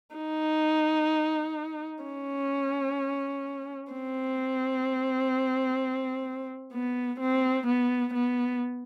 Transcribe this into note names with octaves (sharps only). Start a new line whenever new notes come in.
D#4
C#4
C4
B3
C4
B3
B3